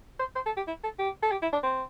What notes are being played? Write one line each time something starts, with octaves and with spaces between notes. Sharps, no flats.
C5
C5
A4
G4
E4
A4
G4
A4
G4
E4
D4
C4